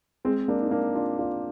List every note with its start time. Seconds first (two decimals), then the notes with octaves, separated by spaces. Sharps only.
0.25 G#3 C4
0.48 A#3 D4
0.62 D#4
0.71 A#3 D4
0.95 D4 F4
1.19 D4 F4